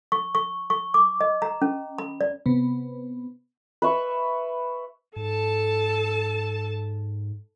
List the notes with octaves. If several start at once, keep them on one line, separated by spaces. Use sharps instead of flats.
C#6
C#6
C#6
D6
D#5
A#5
C#4
B5
D5
C3 B3
B4 E5 C#6
G#2 A4 A5